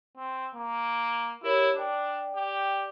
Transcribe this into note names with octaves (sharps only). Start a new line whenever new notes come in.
C4
A#3
E4 G4 A#4 C#5
D4 D5 G5
G4